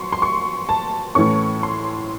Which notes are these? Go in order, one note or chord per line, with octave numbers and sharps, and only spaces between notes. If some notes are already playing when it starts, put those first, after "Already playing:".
Already playing: F#3 C6 C#6
C6
C#6
A5
A2 E3 A3 C#4 C#6
C6